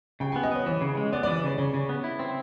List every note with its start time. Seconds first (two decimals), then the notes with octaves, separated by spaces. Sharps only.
0.20 C#3 G5
0.32 B3 G#5
0.43 D#5
0.51 B3 C#5
0.66 E3 C#5
0.81 C#3
0.97 G#3
1.13 B3 D5
1.23 D5
1.27 E3
1.35 D5
1.44 C#3 C#5
1.58 C#3 C#5
1.74 C#3
1.89 B3
2.04 E4
2.19 C4